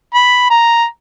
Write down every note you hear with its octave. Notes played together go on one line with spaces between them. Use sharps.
B5
A#5